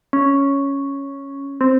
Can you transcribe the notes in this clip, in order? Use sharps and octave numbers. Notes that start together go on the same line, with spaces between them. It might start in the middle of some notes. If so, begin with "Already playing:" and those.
C#4
C4